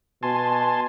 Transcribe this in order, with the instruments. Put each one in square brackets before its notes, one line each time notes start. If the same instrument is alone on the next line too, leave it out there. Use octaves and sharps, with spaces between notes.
[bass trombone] B2 [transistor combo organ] G#5 A5 C6